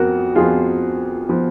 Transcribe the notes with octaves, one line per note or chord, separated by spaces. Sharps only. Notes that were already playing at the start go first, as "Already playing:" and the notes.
Already playing: F2 F3 B3 F#4 A#4
F2 F3 B3 F4 G#4
F3 B3